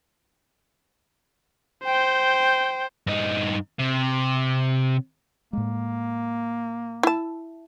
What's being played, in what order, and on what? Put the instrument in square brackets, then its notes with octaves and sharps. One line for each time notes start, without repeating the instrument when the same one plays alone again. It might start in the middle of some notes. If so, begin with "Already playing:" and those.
[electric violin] C5 [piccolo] G5
[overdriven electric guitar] G2 D#4
C3
[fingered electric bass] A2 G#3 [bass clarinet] A#3
[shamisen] E4 A5